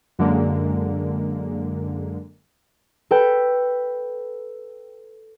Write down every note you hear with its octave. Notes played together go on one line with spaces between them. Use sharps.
F#2 D3 G#3 A#3
A4 B4 G5